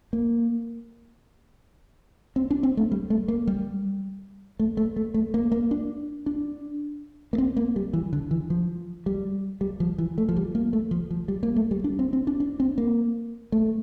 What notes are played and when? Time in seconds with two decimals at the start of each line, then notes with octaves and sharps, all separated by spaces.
0.13 A#3
2.36 C4
2.51 D4
2.63 C4
2.77 A3
2.92 G3
3.10 A3
3.28 A#3
3.47 G3
4.59 A3
4.77 A3
4.96 A3
5.14 A3
5.34 A#3
5.52 A#3
5.71 D4
6.26 D4
7.33 A#3
7.38 C4
7.57 A#3
7.76 G3
7.93 E3
8.13 D3
8.31 E3
8.50 F3
9.06 G3
9.61 G3
9.80 F3
9.98 E3
10.18 A3
10.29 F3
10.36 G3
10.55 A#3
10.73 A3
10.91 F3
11.11 F3
11.28 G3
11.43 A#3
11.56 A3
11.71 G3
11.84 D4
11.99 C4
12.13 C4
12.27 D4
12.40 D4
12.60 C4
12.78 A#3
13.52 A3